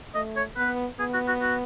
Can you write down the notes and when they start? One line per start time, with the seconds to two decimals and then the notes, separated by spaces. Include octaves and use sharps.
0.14 A3 D#5
0.36 C#5
0.57 B3 B4
0.99 B3 G#4
1.14 F#4
1.28 F#4
1.42 F#4